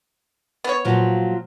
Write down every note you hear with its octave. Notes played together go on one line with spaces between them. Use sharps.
B3 C#5
A#2 F3 F#3